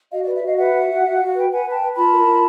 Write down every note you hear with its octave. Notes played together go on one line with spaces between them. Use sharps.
F#4 D#5 F5
D5
B4
D5 E5
F#4 D#5 F5
B4 E5 F#5
F#4
F#4
F#4 E5
F#4 F5
F#5
B4 G5
B4 F#5 G#5
B4
G5 A5
B4
F4 A5 B5
A#4
F4